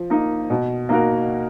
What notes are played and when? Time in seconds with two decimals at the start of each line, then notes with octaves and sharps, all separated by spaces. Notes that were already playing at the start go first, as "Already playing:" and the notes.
Already playing: F3
0.10 A#3 D#4
0.50 B2
0.89 A#3 D#4 F#4 A#4